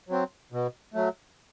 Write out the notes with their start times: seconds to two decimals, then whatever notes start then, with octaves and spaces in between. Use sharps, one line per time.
0.09 F#3 C4
0.52 B2
0.94 F#3 A3